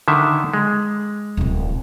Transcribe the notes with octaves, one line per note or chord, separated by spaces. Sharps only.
D3 D#3 E5
G#3
D1 C3